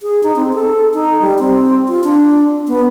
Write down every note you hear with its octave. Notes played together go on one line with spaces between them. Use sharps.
G#4
D#4
C4
A4
D#4
G3
C4
F4
D4
B3